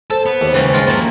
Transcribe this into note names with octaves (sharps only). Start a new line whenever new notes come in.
A4 C5 A5
B3
D#2
C#2 E3 G3 C#4
G2 G#3 F4
F3 F#3 A3 A#3